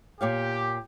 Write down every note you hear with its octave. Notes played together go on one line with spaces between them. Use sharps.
A#2 G4 C#5 F5